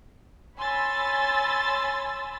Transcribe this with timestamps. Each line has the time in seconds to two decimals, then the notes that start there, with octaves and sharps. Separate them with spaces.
0.58 C#5 G#5 B5 C6 E6 A6